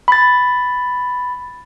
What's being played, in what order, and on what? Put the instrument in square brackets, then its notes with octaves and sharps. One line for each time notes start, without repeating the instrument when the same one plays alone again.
[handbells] B5 A6